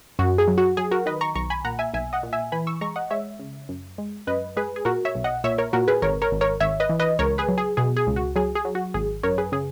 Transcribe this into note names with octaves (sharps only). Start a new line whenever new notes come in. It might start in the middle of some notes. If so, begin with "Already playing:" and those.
F#2 F#4
G#4
F#3
F#4
F#3 G#4
F#4 A#4
D#3 B4 D#5
A#5 C#6
B1 A#5 C#6
G#5 B5
A#2 F#5 A#5
E5 G#5
B1 E5 G#5
D#5 F#5
A#2
E5 G#5
E3 G#5 B5
C#6 E6
G#3 A#5 C#6
D#5 F#5
G#3 C#5 E5
C#3
F#2
G#3
F#2 B4 D#5
G#3 G#4 B4
G#4
A#2 F#4 A#4
C#5 E5
B1
D#5 F#5
A#2 C#5 E5
A#4 C#5
A#2 F#4 A#4
G#4 B4
G#1 A#4 C#5
A#4 C#5
G#1
A#4 C#5
G#1 C#5 E5
B4 D#5
E3
B4 D#5
C#2 A#4 C#5
G#4 B4
F#3
G#4
B2 G#4
G#4
C#2
F#4
F#3 G#4
G#4
F#3
F#4
G#1 G#4
F#2 A#4 C#5
G#4 B4
C#3 G#4